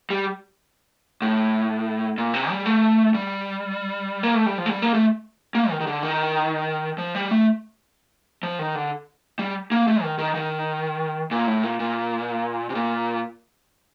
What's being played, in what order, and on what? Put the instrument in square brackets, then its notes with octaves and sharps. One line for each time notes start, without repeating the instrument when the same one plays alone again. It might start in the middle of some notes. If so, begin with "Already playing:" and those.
[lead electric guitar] G3
A2
A#2
C3
G3
A3
G3
A#3
A3
G3
F3
A3
G3
A#3
A3
A#3
D#3
D#3
D3
D#3
F3
G3
A3
F3
D#3
D3
G3
A#3
A3
D#3
D#3
D#3
A#2
A2
A#2
A#2
C3
A#2